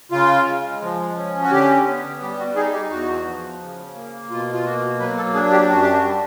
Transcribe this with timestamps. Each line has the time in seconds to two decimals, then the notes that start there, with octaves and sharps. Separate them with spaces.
0.12 C#3 F4
0.47 G#3
0.82 F3
1.16 C#4
1.43 F#4
1.51 D3 G4
1.87 B3
2.21 G3 G4
2.38 F#4
2.55 D#4 G#4
2.73 G4
2.90 E2 F#4
3.26 F3
3.61 C#3
3.95 A#3
4.30 B2 F4
4.53 F4
4.64 A#3 F#4
4.99 F#3 B4
5.17 A4
5.34 D4 G#4
5.52 G4
5.69 F#2 F#4
5.81 G4
5.93 F#4
6.04 G3